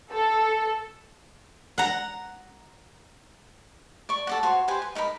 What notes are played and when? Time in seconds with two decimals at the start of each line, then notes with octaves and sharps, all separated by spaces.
0.11 A4
1.78 F#5 A#5
4.09 D5 C#6
4.27 A4 D5 F#5
4.43 F#4 C5 C#5
4.68 G4 B4 C5 G#5
4.82 B4
4.95 D#4 A#4 A#5 B5